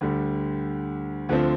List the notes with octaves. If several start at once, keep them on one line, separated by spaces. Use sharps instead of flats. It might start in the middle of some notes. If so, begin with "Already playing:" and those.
D2 D3 G3
D2 D3 F3 C4